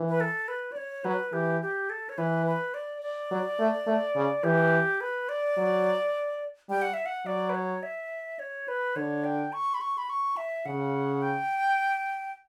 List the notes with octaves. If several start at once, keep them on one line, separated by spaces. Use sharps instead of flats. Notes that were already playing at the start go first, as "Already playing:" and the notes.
Already playing: E3
B4
A4
B4
D5
C#5
F#3 B4
E3 G4
G4
A4
C#5
E3 B4
B4
D5
D5
F#3
A3
A3
C#3
E3 G4
B4
D5
F#3
G3 G5
F#5
E5
F#5
F#3 D5
B4
C#5
E5
C#5
B4
D3 C#5
G5
C#6
B5
C#6
B5
C#6
E5
C#3 F#5
G5